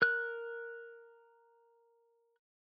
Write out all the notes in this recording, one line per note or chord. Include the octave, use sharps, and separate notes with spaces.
A#4 F#6